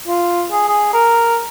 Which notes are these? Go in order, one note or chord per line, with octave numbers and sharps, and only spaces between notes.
F4
G#4
G#4
A#4